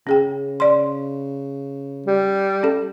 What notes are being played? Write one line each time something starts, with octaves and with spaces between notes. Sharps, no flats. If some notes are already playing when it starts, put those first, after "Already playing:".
C#3 C#4 G#4 G5
D5 C6
G3
C#4 A4